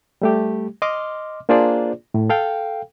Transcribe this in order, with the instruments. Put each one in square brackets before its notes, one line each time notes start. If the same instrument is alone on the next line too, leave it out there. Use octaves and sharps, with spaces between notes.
[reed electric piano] G3 A3 G4
D#5 C6 D6 F6
A#3 D4 F4 G#4 C5 D5
A2
A4 F5 G5